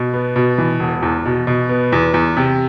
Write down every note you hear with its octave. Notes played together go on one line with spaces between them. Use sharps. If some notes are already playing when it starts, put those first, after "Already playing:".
Already playing: B2
B3
B2
E3
E1
E2
B2
B2
B3
E2
E2
C3